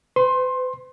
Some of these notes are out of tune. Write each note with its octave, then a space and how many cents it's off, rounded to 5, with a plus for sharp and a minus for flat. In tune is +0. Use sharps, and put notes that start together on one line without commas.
B4 +45 C6 +20